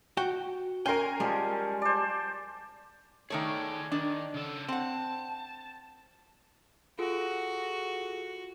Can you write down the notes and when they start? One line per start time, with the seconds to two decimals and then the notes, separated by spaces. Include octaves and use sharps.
0.17 F#4 F#5 G5
0.86 C#4 A#4 G5 G#5 C6
1.20 F3 G3 G#3 G#4
1.82 C5 D5
3.30 D#3 A3 G#4 C#5 D5
3.92 D#3 D4
4.34 C#3 A4
4.69 C4 F#5 A5
6.99 F4 F#4 G#4 A4